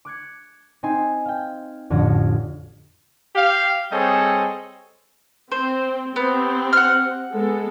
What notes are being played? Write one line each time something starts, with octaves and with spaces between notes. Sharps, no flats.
D6 F#6 G#6 C#7
C4 D#4 G5 G#5 C6
F5 G5
A1 F2 D3 F#4
G4 F5
G3 C4 G#4 A4 C#5 D#5
C4 C5
B3 C4 G4
F#5 F6
G#3 B3 A4